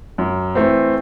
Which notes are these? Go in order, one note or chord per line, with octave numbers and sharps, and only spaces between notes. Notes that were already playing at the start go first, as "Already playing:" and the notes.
F#2
E3 A3 C4